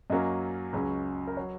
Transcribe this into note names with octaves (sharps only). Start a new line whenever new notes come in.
F#2 F#3 A#3 C#4 D#5
C#2 C#3 F#3 C#4
A#4
F#3 C#5